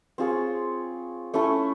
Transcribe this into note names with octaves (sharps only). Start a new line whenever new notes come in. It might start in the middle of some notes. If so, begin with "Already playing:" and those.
C4 F4 G#4 C#5
A3 C#4 E4 A4